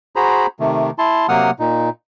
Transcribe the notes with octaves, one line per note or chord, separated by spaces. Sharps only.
F#4 G#4 C5 A#5 B5
C3 D#3 A3
E4 A5 C6
C3 F#3 A#3 F#5 D#6 F6
A#2 D#4